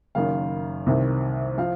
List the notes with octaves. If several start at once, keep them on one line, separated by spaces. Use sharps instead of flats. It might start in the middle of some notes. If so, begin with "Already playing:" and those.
F#1 F#2 D#3 F5
C2 C3 D#3
F3 F5